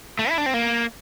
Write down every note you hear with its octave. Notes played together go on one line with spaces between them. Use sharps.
A3
E4
D4
C4
A#3